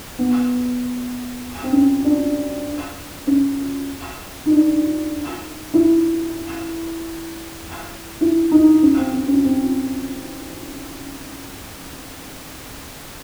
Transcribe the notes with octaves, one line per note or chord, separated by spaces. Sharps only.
B3
C4
C#4
D4
C#4
D#4
D4
E4
E4
D#4
C#4
C4
C4
C#4
C4